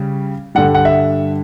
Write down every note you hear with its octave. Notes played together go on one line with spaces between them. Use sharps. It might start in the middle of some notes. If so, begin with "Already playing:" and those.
Already playing: C#3 G3 C#4
G2 D3 G3 F#5
F#5
E5